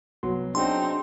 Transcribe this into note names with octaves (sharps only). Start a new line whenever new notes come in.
C2 F#3 B3 C6
C4 D4 D#4 F#4 G#4 C6